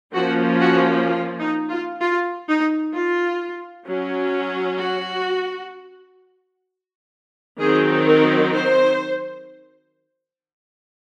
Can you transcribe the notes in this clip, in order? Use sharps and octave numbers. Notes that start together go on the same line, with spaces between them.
F3 A#3 C#4 F#4
F#4
F4
D#4
F4
F4
D#4
F4
F#3 C#4
F#4
D#3 F#3 C4 D#4 G#4
A#4
C5